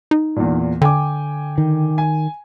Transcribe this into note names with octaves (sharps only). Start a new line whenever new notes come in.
D#4
E2 A#2
D3 G5 G#5 D6
D#3
G#5